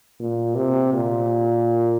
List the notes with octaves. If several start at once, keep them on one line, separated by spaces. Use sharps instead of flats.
A#2
C3
A#2